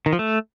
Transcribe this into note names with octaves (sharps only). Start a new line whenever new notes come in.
D#3
F3
A3